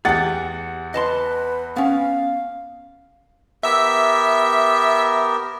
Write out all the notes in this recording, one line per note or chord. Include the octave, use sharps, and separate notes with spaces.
E2 G4 G#4 F#5 A6
B4 D#5 A5 C6
B3 C#4 F5
B3 G4 A#4 E5 E6